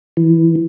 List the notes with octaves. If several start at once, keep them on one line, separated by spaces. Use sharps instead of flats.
E3